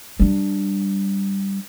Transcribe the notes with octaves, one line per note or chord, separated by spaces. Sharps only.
G3 D4